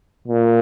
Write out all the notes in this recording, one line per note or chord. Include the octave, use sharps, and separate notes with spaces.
A#2